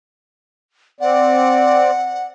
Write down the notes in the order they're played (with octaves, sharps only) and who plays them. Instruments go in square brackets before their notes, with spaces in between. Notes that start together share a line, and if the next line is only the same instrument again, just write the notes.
[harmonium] C4 D5 [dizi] F#5